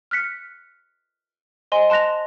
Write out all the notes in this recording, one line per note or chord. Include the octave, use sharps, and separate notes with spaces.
F6 F#6 B6 C#7
C5 D#5 G#5 C6
A5 C6 F#6 A#6 F7